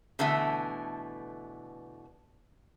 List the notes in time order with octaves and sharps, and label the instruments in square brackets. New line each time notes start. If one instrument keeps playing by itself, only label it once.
[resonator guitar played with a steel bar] B2 D3 E3 A3